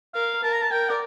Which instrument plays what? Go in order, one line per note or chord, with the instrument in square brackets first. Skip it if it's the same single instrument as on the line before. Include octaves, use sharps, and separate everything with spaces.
[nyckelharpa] A#4 [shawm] F5
[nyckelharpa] A#4 [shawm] A5
[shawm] A#5
A5
[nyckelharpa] A#4 [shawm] G5
[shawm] D5